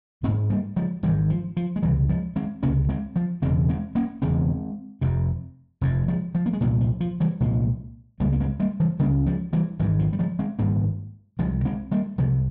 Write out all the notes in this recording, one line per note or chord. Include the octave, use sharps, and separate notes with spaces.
G#1 G#3 C4
G#2
G3 A#3
F3 G#3
G#1 G#2 E3 G3
F3
F3
G#3
C#2 C3 E3 G3
F3 G#3
G#3 C4
C#2 C3 A#3 C#4
G#3 C4
F3
E1 E2 C#3 G#3 C4
G#3 C4
A#3 C#4
E1 E2 C#3 G#3 C4
F1 F2 C3
F1 F2 C3
F3 G#3
F3
A#3
G#3
C2 A#2 E3 G3
F3
F3
E3 G3
C2 A#2 F3 G#3
C#2 C#3 G3 A#3
A#3
G#3 C4
G3 A#3
E3 G3
C#2 C#3 G3 A#3
F3 G#3
E3 G3
G#1 G#2 E3 G3
F3
G3
F3 G#3
G#3 C4
G#1 G#2 G3 A#3
C2 C3 F3 G#3
G#3 C4
G3 A#3
C2 C3 F3 G#3